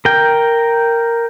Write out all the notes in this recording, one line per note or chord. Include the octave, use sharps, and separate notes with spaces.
A#4 G5